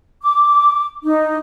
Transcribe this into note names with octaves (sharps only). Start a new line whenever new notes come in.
D6
D#4